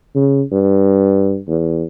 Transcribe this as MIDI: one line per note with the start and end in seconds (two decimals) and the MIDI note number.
0.15 0.42 49
0.52 1.38 43
1.48 1.84 40